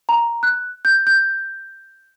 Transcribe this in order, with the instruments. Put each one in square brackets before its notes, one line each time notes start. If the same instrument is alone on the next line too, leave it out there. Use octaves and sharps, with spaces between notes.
[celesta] A#5
F#6
G6
G6